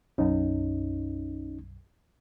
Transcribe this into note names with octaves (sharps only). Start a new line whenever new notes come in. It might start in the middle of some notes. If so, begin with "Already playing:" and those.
B1 F#2 C#4 D#4